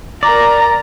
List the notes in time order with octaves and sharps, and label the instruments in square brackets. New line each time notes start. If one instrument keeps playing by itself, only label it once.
[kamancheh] A#4 A#5 [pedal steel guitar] D5